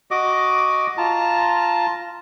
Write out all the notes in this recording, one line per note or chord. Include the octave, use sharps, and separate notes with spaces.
F#4 D#5 D6
F4 A5 A#5